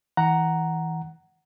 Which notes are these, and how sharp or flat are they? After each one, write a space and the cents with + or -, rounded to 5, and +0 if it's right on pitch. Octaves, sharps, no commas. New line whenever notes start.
E3 -30 F#5 +10 A#5 +0